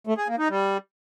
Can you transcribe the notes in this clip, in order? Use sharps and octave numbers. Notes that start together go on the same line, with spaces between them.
A3
G#4
A#3
D#4
G3